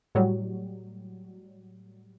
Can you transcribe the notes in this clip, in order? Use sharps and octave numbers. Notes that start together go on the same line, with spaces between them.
A2 F#3 G3